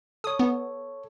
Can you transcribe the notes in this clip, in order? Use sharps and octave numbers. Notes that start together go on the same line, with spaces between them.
A4 C#5 D#6
B3